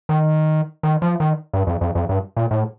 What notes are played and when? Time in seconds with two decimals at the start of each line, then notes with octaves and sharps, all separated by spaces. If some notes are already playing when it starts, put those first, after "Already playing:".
0.09 D#3
0.83 D#3
1.02 F3
1.20 D#3
1.53 G2
1.67 F2
1.81 F2
1.95 F2
2.09 G2
2.37 A#2
2.51 A2